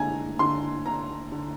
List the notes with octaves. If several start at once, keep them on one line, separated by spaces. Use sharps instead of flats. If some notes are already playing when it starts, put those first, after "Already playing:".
Already playing: D3 G#3 G#5 A#5
D3 C6
D3 A#5
D3